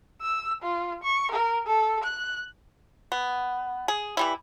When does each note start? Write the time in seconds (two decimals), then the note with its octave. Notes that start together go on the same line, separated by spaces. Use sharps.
0.22 E6
0.63 F4
1.03 C#6
1.32 A#4
1.67 A4
2.04 F#6
3.12 B3
3.88 G#4
4.17 E3 G3 E4